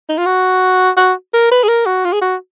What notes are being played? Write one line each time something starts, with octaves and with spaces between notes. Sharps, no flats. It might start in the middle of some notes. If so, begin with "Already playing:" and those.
D#4
F4
F#4
F#4
A#4
B4
G#4
A#4
F#4
F4
G#4
F#4